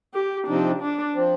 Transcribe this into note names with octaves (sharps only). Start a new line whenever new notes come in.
G4
C3 F3 C4 D4 D#4
D4
F3 C4